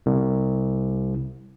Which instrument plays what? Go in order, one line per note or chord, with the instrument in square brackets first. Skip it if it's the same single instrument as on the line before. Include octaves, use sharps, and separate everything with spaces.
[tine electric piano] C2